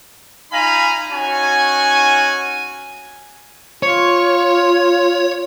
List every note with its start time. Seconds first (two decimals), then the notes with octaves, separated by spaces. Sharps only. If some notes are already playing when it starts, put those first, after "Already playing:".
0.52 D#4 F4 F5 G#5 A#5 B5
1.12 C#4 D#4 F#4 G#5
3.83 F4 C#5